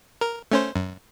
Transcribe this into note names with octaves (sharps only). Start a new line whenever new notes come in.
A#4
A3 C#4 C5
F#2